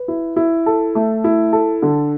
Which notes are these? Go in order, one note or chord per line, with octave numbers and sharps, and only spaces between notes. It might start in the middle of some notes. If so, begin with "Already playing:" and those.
Already playing: B4
E4
E4
A4
A3
E4
A4
D3